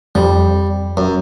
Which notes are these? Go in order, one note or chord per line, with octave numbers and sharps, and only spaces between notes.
F2 G3
F#2